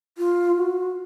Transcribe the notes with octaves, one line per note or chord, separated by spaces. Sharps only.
F4
F#4